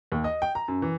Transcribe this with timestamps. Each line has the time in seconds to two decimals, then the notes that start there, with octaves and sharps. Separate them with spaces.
0.12 D#2
0.24 D#5
0.42 G5
0.55 A#5
0.68 F#2
0.82 E3